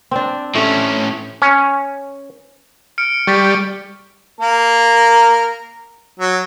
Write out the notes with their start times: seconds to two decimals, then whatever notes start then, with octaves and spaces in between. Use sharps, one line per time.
0.11 C4 D4
0.55 A2 A3 C#4
1.42 C#4
2.98 F6 C#7 D7
3.27 G3 C#6 A6 B6
4.41 A#3 A#4
6.20 F#3